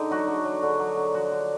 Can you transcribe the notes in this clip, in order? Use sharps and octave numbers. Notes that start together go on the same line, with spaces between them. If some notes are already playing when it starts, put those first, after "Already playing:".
Already playing: D3 D#4
F#3 F#4
D3
F#3
D3
F#3
D3
F3 F#4
D3